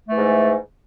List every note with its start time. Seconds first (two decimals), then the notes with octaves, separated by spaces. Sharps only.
0.08 A3
0.12 E3
0.16 G#2